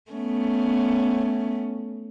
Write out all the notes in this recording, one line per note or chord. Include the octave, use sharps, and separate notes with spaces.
A3 B3 C#4